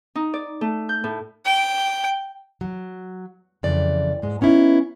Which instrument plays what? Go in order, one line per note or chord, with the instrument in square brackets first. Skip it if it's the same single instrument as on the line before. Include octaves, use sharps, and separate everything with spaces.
[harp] D#4
D5
A3
G6
A2
[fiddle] G5
[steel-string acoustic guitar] F#3
F2 C#3 E3 D5
G#2 G#3
B3 C#4 D#4 E4